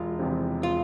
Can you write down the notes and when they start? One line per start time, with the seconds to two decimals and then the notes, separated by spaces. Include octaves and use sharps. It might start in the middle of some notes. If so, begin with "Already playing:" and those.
Already playing: E1 F4
0.19 E2 C3 F3 C4
0.63 F4